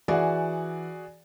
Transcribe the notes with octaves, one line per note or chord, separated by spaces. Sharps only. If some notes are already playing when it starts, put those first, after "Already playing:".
E3 F#4 G#4 D5 F#5